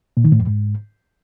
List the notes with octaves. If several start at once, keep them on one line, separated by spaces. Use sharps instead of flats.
A#2
D#3
A2
F2
G#2